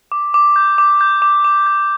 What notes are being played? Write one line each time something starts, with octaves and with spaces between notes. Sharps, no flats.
D6
D6
G6
D6
G6
D6
D6
G6